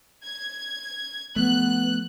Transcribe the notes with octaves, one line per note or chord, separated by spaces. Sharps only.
G#6
F3 A3 B3 F#6